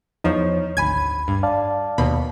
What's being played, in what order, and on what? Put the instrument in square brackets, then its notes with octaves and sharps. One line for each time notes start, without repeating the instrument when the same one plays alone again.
[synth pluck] E2 F3 [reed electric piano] D#4 C#5
[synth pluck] G#1 G#5 G#6 [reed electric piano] D2 B5
[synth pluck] G2
[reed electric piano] D5 F5 A5
[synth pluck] D#2 B2 B5